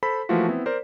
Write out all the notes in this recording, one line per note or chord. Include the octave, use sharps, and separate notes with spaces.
A4 C5 B5 B6
E3 F3 A3 A#3 F4 F#4
B3 C4 E4
A#4 C5 D5